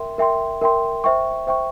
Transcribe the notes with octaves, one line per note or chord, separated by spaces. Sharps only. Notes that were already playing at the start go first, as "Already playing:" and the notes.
Already playing: A#4 E5 G5 C6
A#4 E5 G5 C6
A#4 E5 G5 C6
C5 E5 G5 C#6
C5 E5 G5 C#6